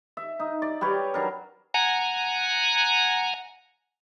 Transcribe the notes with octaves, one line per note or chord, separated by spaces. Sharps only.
E5
D#4
D5
G3 G4 B4 C#5
F#3 D4 A#4
F#5 G#5 A#5